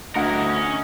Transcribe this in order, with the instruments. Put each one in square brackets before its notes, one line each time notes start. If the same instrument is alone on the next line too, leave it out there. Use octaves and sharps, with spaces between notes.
[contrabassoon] D2 [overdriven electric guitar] E4 A#4 [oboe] D#5 [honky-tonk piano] F#5 C#7
[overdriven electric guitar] C#4